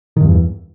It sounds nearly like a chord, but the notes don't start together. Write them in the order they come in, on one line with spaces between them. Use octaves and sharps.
D#3 G2 E2 E3